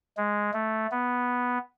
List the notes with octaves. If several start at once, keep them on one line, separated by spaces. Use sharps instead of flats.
G#3
A3
B3